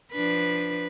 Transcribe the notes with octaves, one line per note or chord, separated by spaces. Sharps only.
F3 D4 B4